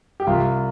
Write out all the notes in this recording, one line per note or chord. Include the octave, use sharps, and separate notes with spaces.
G4
C2 F4